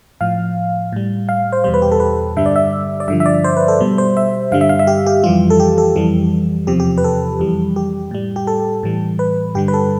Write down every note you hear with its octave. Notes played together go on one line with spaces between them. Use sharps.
A2 F3 F5
A2 G3
F5
C5
E2 B2 G3 C5
B4
G4
A4
B4
G2 D3 G3 E5
D5
E5
D5
G2 D3 F3 E5
E5
D5
C5
B4
A4
B2 G3
C5
E5
G2 D3 G3 F5
E5
F5
E5
G4
G4
F2 E3 G3 F4
A4
G4
A4
F2 E3 G3
E2 C3 F3 G4
G4
B4
A4
F2 E3 G3
G4
A2 G3
G4
A4
A2 E3 G3
B4
G2 D3 G3 G4
B4
A4